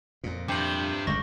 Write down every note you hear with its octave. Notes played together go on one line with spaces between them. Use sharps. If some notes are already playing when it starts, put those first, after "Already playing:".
F2 A#2
G2 C3 F3 D6 G6 F#7
G1 C#2 C#3 C#6 A#6